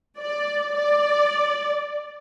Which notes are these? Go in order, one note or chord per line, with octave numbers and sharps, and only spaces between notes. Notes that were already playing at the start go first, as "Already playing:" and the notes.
D5
D5